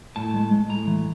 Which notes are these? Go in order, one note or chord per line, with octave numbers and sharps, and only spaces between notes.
A2 A5
G#3
G#3
A2 A#5
E3